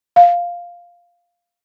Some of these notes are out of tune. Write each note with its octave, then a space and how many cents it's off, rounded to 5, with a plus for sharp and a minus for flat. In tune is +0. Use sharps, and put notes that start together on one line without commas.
F5 +0